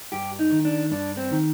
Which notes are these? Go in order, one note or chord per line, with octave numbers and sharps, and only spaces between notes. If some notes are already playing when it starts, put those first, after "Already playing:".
G2 G4
D#4
D#3
D4
G2 D4
C4
D#3